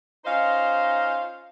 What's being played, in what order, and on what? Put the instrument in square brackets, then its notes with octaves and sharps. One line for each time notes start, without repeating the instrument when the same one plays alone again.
[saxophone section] C#4 D#4 F4 C5 D#5 F5